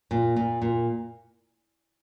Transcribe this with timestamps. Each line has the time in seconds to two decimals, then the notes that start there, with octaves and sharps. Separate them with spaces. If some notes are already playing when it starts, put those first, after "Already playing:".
0.11 A#2
0.36 A#2
0.62 A#2